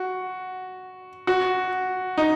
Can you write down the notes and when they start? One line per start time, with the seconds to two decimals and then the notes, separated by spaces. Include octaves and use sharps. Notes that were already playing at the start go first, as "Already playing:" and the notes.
Already playing: F#4
1.27 F#4
2.18 D#4